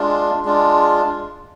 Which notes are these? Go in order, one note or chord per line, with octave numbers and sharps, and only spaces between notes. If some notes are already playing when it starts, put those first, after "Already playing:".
Already playing: G#3 D4 F4
G#3 D4 F4